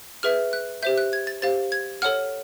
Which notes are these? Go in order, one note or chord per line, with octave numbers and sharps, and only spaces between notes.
G#4 B4 E5 F6
F#6
G4 C5 E5 G6
F#6
G#6
A6
G4 C5 F5 A6
G#6
A4 C#5 F#5 F6